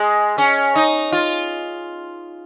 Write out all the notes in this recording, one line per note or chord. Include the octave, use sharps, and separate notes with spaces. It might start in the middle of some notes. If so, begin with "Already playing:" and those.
Already playing: G#3
C#4
D#4
F4